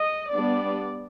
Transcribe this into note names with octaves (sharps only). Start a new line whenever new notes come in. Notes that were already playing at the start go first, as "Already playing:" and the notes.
Already playing: D#5
G3 B3 D4 D5